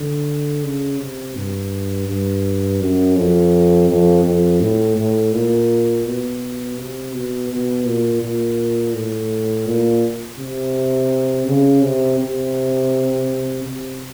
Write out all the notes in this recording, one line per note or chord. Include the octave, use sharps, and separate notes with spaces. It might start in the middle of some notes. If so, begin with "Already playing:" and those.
Already playing: D3
C#3
C3
G2
G2
F#2
F2
F2
F2
A2
A2
A#2
B2
C3
B2
B2
A#2
A#2
A2
A#2
C3
C#3
C3
C3
C3